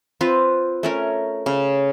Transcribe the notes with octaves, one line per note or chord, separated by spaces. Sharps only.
C4 F4 B4
A3 C#4 A#4
C#3